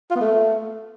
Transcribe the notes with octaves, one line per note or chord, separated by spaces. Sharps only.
F4
B3
A3